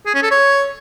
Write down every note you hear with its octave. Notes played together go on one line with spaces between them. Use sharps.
G#4
C#4
A4
C#5